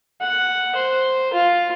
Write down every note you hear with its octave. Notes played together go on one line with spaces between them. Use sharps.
F#5
C5
F4